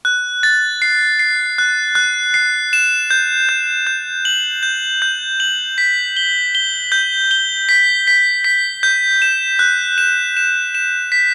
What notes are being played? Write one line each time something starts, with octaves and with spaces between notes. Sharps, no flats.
F#6
A6
C7
C7
F#6
F#6
C7
E7
G6
G6
G6
F#7
G6
G6
F#7
B6
G7
G7
G6
G7
B6
B6
B6
G6
E7
F#6
E7
E7
E7
B6